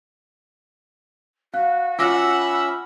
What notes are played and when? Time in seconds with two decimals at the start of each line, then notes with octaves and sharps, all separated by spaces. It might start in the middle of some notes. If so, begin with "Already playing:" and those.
1.54 F#4 F5 F#6
1.99 C#4 F4 E5 F#5 D6 E6 A#6
2.37 B5